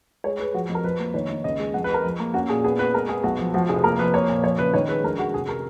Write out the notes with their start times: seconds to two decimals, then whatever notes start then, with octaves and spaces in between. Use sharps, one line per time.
0.24 G#3 C#5
0.39 G#3 B4
0.54 F3 F#4
0.69 F2
0.75 A#4
0.84 F3 B4
0.99 A#3
1.14 D#3 C#5
1.29 D#3
1.44 C#2 D#5
1.59 G#3
1.74 F2 F#5
1.84 B4
1.89 G#3 A#4
2.04 F3
2.19 A#3
2.34 C#4 F#4
2.49 A#2 G#4
2.64 B3 G#4
2.79 B3 B4
2.94 G#3 A#4
3.09 B3 G#4
3.24 B1 F#4
3.39 F3
3.54 F3 F#4
3.69 F1 G#4
3.84 A#3 A#4
3.99 F3 B4
4.14 A#3 C#5
4.29 A#2
4.43 F3 C#5
4.59 F#1 B4
4.74 D#3 C#5
4.89 G#3 B4
5.04 A#1 A#4
5.19 G#3 F#4
5.34 F1 G#4
5.49 A#4